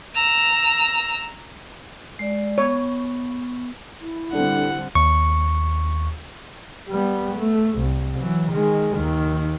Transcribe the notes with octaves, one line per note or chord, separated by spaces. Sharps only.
A#5 E6
G#3 D5
B3 C#5 C#6
E4
D3 G3 C4 D4 A4 F#5
D#2 C#6
G3 B3
A3
C2
E3 F#3
D#3 G#3
D#2 D#3